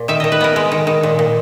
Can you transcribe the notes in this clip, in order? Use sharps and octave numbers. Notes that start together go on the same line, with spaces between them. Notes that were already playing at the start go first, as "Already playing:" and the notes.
Already playing: A#2
D#3 E5
D#3 D#5
B4
B3 A#4
G#3
D#3
D#3
A#2
A#2